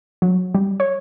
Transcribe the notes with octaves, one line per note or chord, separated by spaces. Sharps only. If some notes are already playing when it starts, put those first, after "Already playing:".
F#3
G3
C#5